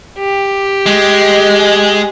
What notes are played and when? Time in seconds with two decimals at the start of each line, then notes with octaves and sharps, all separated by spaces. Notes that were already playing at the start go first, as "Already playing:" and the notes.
0.18 G4
0.86 G#3